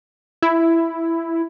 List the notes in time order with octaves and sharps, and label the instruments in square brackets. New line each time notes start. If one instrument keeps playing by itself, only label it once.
[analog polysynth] E4